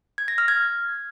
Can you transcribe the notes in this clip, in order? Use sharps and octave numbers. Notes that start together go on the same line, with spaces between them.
G#6
A#6
F6
G#6